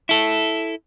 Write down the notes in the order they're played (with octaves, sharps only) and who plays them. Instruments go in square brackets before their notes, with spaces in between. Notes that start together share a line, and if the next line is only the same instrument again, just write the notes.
[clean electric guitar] E4 A4